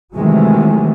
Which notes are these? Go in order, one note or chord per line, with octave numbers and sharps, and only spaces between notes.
C3 D#3 E3 F#3 G#3 A3